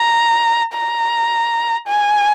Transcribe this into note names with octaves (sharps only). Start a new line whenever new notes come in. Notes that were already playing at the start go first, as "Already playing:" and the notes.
Already playing: A#5
A#5
G#5